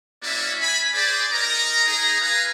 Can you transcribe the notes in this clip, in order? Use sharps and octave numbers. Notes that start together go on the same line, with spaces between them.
A#3 C#4 E4 F#4 D5 E5
G#5 B5
G#4 C5 D5
D#4 A#4 D#5 A#5
D#4 G#4 A#5
B4 F5 G#5 A#5